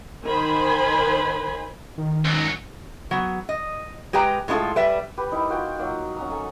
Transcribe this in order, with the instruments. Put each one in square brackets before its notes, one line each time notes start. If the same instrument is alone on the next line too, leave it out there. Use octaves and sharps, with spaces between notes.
[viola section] D#3 C5 G#5 B5
[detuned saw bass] D#3
[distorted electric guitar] C#2 F#3
[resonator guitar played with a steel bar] F#3 B3
D#5
G#3 G4 B4 G5 A#5
A2 G#3 B3 D4 F4 A4
G3 B4 E5
[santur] G4 B4
D#4 E4 A#4 G5
F4 F#4 A#4 G5
F#3 A#3 D#4
C#4 F#4 A#5
A4 F#5 G#5